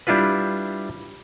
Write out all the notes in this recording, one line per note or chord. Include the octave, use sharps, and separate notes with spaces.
G3 D4 E4 F4 B4